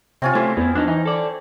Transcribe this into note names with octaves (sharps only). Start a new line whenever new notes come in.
C3 C4 C#4 F4
A3 E4 G4 C5
E2 B3 C4
F3 B3 D4 D#4
E3 D#4
A4 D5